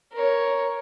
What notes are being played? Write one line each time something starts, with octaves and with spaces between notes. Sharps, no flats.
A#4 C#5